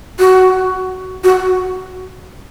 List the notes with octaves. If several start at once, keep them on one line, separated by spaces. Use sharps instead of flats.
F#4
F#4